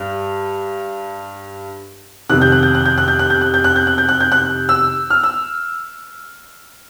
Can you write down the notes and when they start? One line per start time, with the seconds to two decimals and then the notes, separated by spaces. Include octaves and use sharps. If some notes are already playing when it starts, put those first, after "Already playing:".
Already playing: G2
2.29 F2 C3 D#3 F#6
2.42 G6
2.52 F#6
2.63 G6
2.75 F#6
2.86 G6
2.98 F#6
3.08 G6
3.19 F#6
3.30 G6
3.41 F#6
3.54 G6
3.64 F#6
3.76 G6
3.87 F#6
3.98 G6
4.09 F#6
4.21 G6
4.32 F#6
4.69 E6
5.10 F6
5.23 E6